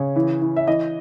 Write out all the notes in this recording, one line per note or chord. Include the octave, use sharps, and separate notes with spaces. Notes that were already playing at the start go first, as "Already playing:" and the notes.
Already playing: C#3 C#5
E3
E3
E5
E3 D#5